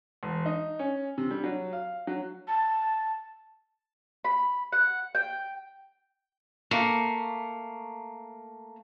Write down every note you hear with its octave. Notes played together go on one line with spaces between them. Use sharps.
E1
D#4
C#4
C3
G3
F#3
F5
F#3
A5
B5
F#5
G5
A3 A#3